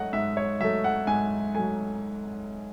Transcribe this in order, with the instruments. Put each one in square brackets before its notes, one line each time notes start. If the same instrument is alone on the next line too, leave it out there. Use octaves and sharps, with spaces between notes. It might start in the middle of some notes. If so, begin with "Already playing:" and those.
Already playing: [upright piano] G#2 F#3 A3 D#5 F#5
G#2 E5
C#5
F#3 A3 E5
F#5
G#2 G#5
F#3 A3 G#5